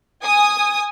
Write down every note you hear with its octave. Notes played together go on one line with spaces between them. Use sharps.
G#5 D#6